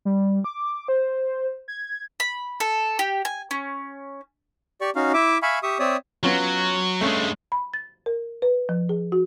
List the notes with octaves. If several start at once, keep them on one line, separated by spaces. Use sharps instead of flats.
G3
D6
C5
G#6
B5
A4
G4
G#5
C#4
G4 D5 C#6
C#4 D#4 F#4 F5
E4 E5 D6
E5 F5 G#5 B5 C#6
G4 E5 C#6 D#6
C4 C#5 D5 E5 D#6
F#3 B3 C#4 F4
G2 G#3 A3 C#4
B5
A6
A#4
B4
F3
G#4
F#4